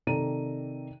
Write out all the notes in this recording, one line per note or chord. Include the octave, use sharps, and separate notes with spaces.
C3 D#3 A4 D5 A#5 D#7